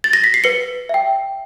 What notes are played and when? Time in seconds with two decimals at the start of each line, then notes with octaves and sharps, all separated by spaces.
0.04 A6
0.13 A#6
0.24 B6
0.34 C7
0.44 B4 C#7
0.89 E5 G5